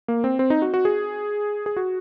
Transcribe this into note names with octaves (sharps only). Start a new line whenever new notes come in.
A#3
C4
C4
D#4
F#4
F#4
G#4
G#4
F#4